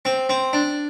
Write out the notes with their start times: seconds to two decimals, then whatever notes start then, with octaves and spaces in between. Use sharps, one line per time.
0.05 C4
0.29 C4
0.53 D4